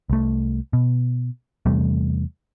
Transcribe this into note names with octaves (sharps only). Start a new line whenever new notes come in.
C2 A3
B2
E2 C3 G3 A3